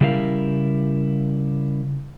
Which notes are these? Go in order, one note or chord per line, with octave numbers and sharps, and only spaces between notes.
C#3 G3 E4 A#4 F5